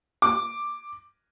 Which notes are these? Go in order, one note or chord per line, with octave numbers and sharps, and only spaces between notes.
D6